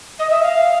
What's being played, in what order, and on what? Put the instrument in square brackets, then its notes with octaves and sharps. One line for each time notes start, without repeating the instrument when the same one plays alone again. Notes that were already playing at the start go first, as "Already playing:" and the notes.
[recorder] D#5
E5
F5